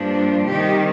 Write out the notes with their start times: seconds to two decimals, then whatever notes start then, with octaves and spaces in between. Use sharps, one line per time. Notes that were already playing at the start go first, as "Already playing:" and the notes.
Already playing: G2 F3 A#3 D4
0.49 C3 D#3 G3 G4